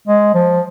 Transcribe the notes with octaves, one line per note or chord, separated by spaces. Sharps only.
G#3
F3